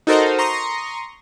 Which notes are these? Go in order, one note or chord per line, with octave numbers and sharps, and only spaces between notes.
D#4 F#4 A4 A#4 C5 D#5
A#5 C6 C#6 D#6 A#6